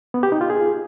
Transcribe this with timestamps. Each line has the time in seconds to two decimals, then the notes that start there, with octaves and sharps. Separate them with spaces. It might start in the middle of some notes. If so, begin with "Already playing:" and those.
0.14 B3
0.23 G4
0.32 D#4
0.41 F4
0.50 G#4